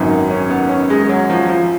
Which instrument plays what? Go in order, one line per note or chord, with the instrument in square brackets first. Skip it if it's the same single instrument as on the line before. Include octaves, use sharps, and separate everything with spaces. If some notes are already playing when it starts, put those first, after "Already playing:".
Already playing: [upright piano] G#1 F#2 D#3 [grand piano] B3
[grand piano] D#4
C#4
B3
C#4
G#3
F#3
F3
F3